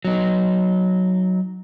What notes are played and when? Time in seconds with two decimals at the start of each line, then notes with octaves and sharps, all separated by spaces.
0.05 F#3 D#4